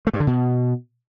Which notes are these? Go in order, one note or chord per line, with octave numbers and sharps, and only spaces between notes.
A3
G2
D3
B2